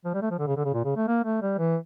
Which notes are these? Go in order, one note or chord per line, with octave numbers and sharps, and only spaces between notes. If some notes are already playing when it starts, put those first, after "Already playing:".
F3
G3
A3
F3
D3
C#3
D3
C#3
A#2
C#3
A3
A#3
A3
G3
E3